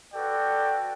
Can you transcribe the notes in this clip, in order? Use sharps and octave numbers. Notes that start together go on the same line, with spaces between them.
F#4 A4 B4 D5 G5